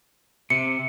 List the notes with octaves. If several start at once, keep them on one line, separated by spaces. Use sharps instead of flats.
C3 C#7